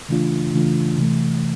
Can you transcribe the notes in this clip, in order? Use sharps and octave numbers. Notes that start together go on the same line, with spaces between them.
C#3 E3 A3 D4 F4
C#3 E3 A3 D4 F4
C3 E3 A3